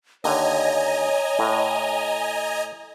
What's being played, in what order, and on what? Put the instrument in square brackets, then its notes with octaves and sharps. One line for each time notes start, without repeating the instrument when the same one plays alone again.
[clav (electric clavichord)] D#2 D3 [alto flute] C#5 [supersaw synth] D#5 G#5 A#5
[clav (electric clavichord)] A2